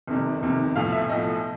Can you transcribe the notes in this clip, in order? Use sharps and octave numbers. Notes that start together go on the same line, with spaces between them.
G1 F2 C3 D#3
G1 F2 C3 D#3
B1 A2 F3 F5
E5
B1 A2 F3 D#5